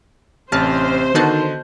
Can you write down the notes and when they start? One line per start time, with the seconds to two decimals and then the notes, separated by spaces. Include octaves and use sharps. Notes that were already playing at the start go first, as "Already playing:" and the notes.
0.52 A1 C3 C#4 C5 A5 F6
1.15 D3 D#3 B3 F#4 D#5 A5 G6